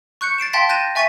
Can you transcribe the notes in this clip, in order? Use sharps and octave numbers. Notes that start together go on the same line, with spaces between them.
C#6 F#6 G6 C#7
A6 C7 D7 E7
F5 G5 A5 C6 A6 B6
F#6 G6 A6 A#6 D#7 E7
E5 G#5 C#6 A6 B6 D#7